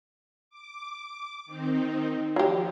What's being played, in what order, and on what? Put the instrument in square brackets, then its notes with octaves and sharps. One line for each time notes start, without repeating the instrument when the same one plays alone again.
[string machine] D6
D#3 C4 D#4
[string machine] F3 [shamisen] F#3 G4